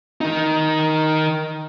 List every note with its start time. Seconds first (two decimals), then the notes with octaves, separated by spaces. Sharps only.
0.21 D#3 D#4